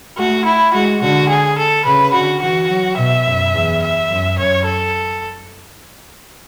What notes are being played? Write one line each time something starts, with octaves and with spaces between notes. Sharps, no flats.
A3 F#4
E4
G#3 F#4
D3 F#4
G#4
A4
C#3 B4
D3 F#4
E3 F#4
F#3
B2 E5
F#2
E2
E5
F#2
F#2 C#5
A4